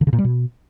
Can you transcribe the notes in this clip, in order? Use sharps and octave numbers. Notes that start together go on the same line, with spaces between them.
D3
C#3
A#2
G3
B2